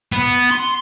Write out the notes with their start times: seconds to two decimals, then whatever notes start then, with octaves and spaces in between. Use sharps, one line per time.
0.12 B3
0.51 C6